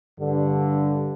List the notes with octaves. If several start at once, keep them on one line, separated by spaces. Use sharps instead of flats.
G2 D3